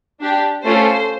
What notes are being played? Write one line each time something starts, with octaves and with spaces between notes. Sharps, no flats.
D4 G4
A3 C#4 F4 A4 C5